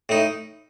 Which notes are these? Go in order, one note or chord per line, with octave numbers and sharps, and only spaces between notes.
A2 D#4